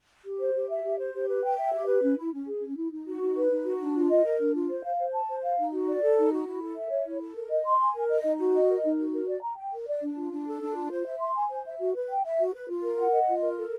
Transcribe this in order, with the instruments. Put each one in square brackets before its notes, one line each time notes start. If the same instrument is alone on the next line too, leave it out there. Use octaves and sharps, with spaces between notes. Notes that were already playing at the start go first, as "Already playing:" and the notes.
[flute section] G4
C5
G4
E5
G4
C5
G4
B4
G5
E5
G4
B4
C#4
E4
C#4
G#4
C#4
E4
D#4
F#4
D#4
B4
D#4
F#4
D4
F4
D#5
A#4
D4
F4
C5
F5
C5
A5
C5
F5
D#4
F#4
D5
A4
D#4
F#4
E4
A4
E5
C#5
E4
A4
A#4
D#5
C6
G#5
A#4
D#5
D#4
F#4
D#5
A#4
D#4
F#4
A#4
D5
A#5
G5
A#4
D5
D4
F4
D4
A4
D4
F4
C5
E5
C6
G#5
C5
E5
F#4
B4
G5
E5
F#4
B4
F4
A#4
F#5
D#5
F4
A#4
A4